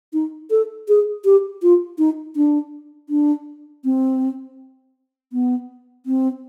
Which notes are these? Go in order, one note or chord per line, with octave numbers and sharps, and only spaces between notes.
D#4
A4
G#4
G4
F4
D#4
D4
D4
C4
B3
C4